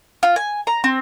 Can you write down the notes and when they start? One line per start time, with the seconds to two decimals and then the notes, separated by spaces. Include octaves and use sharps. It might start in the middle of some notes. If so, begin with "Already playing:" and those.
0.23 F4
0.36 G#5
0.67 A#5
0.84 C4